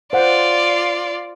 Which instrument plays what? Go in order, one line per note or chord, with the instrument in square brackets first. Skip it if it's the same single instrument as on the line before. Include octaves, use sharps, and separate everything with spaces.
[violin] F4 D5 [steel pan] C5 F#5